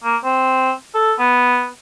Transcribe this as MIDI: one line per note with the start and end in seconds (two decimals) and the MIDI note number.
0.04 0.16 58
0.24 0.72 60
0.95 1.13 69
1.19 1.67 59